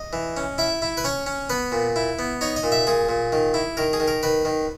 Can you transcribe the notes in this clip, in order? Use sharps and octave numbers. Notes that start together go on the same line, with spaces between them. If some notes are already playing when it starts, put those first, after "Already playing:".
Already playing: D#5
E3
C#4
E4 E5
E4
B4
C#4 C#5
C#4
B3 B4
A#2
E4
B3
D#4 C#5
D#5
A#2
E5
A#2 G#4
A#2
D#3
E4
D#3 A#4
G#4
D#3
A#4
D#3 B4
D#3